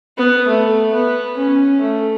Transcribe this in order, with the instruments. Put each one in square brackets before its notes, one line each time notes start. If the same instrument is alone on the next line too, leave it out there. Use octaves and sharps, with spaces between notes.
[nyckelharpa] B3
A3
B3
C#4
A3